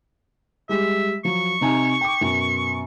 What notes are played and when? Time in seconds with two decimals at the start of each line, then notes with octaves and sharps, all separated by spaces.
0.69 G3 G#3 E5
1.25 F3 F#3 C#6
1.61 C3 D#4 G#5
2.01 G5 D6
2.21 F#2 B2